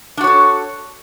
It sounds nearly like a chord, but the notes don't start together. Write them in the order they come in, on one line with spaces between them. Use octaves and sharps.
D4 F#4 C#5 A4